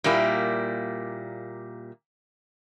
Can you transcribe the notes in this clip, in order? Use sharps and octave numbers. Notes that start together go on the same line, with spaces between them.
A#2 G3 A#3 E4